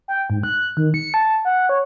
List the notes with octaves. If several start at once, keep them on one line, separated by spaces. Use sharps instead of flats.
G5
G#2
F#6
D#3
C#7
A5
F#5
C#5